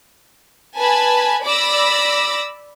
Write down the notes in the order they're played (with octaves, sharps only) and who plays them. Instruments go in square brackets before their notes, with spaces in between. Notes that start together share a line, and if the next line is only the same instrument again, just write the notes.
[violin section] B4 G#5 A5 B5
D5 B5 D6 E6 A#6